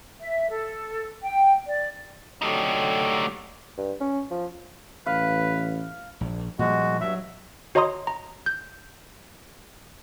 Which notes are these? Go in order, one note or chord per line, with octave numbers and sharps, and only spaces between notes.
E5
A4
G5
D5
D3 F#3 A3 D#4 G4
G2
C#4
F3
A1 B4 F5
A#1
A#2 F3 G3 G#3 F#4
G2 F#3 E5
F#4 C#5 D#5 A#5 C6 D#6
A#5
G6